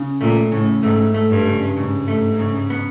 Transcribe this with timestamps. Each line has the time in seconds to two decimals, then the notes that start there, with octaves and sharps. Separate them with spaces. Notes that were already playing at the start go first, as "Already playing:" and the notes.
Already playing: C#3
0.21 A#2 A3
0.52 A2 C#3
0.83 G#2 A3
1.14 A3
1.29 G2
1.46 C#3
1.76 G#2 C#3
2.08 A3
2.39 C#3
2.70 B3